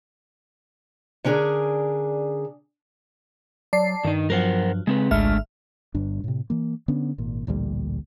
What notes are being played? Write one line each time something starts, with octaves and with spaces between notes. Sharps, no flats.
D3 C#4 D4 G4 G#4 A#4
F#3 D5 A5 C7
G2 D#3 D#4
F3 F#3 A#4 C5 F#5
C#3 G#3 C4 B4
G#1 C#2 D3 G#3 A3 E5 F6
G1 G2 D4
A2 C3
E3 A#3
D3 B3 C#4 D4
G#1 A#2
A1 D2 A#2 G3